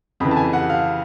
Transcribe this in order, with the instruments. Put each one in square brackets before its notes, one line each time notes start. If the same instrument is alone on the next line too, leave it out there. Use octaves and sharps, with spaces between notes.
[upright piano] F2 C#3 E3 B5
A5
G#5
F#5
F5